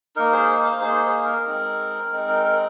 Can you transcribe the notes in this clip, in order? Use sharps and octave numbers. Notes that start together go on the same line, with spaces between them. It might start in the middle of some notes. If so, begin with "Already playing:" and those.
A#3 D#4 A#4
G#4 C5
C5 F5
A#3 D#4 G#4 C5
G#4
A#4
G#3 C4 D#4
G#3 C4 D#4
A#4
A#4